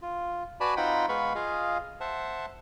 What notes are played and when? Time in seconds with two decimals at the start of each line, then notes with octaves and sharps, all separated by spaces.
0.02 F4
0.60 F#4 B4 D5 G#5 A5 B5
0.77 C4 D#4 F4 F#5 G5 B5
1.09 G#3 B3 B4 F5 B5 C#6
1.35 F4 G#4 D#5 F5
2.01 C5 E5 F#5 A5